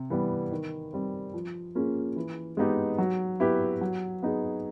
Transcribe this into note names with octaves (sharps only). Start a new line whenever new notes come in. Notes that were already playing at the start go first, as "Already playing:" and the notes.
Already playing: C3
E3 G3 B3
D#3
G3 C4
F3
A#3 C#4 F4 G#4
E3
G#3 B3 D#4 G4
F#3
B3 E4 G4 B4
F#3
B3 D#4 G#4